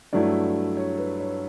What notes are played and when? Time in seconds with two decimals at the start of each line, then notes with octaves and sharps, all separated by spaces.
0.13 G2 F#3 A3 E4 D5
0.77 C#5
0.98 B4
1.20 C#5